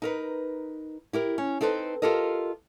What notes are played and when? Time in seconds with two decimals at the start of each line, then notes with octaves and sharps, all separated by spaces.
0.02 D#4 A#4 B4
1.13 E4 G4 A#4
1.38 C#4
1.61 C4 D#4 A4 B4 C5
2.02 F4 G4 A4 A#4 D#5